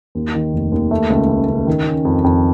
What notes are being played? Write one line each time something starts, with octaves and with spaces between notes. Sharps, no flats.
D#2
D#3
F1
D#2
A3
C#2
C#3
C#3
D#3
C#4
F2
F2